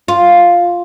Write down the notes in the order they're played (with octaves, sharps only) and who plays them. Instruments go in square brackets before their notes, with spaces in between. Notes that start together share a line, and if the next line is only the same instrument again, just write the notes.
[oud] F4